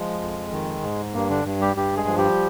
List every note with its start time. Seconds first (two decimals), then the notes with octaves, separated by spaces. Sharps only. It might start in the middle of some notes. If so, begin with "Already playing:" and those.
Already playing: F3 G#3
0.21 F2
0.52 D#3
0.83 G#2
1.14 G2 A#3
1.30 D3 D4
1.45 G2
1.61 G3 G4
1.76 G2 G3 G4
1.97 G#3 G#4
2.08 F3
2.17 G3 G4